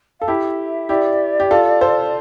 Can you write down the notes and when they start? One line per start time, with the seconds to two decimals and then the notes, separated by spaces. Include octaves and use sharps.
0.20 A4 F5
0.28 E4 G4 E5
0.89 E4 G4 D5
1.40 G4
1.51 F4 A4
1.81 A4 C5